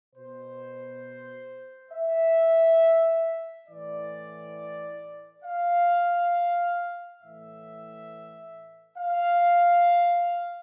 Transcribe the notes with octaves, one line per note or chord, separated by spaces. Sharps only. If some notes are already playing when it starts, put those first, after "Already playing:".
B2 C5
E5
A2 E3 D5
F5
A2 E3 E5
F5